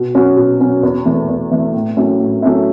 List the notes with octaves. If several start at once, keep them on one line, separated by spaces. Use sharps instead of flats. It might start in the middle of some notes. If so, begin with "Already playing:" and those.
Already playing: B2
F#3 C#4 F#4
B2
F#3 C#4 F#4
E2
E3 A3
E2
E3 A3
A2
F#3 A3 C#4 E4
A2
F#3 A3 C#4 E4